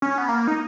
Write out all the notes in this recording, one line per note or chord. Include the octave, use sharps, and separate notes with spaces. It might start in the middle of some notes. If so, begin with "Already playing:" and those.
C#4
B3
A#3
D#4